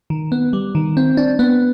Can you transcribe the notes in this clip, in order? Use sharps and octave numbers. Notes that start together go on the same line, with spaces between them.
D#3
B3
G3
D#3
C4
D4
B3